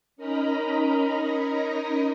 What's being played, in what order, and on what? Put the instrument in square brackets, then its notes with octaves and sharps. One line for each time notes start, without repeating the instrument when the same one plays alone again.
[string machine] C#4 D#4 A#4 D#5 A#5 B5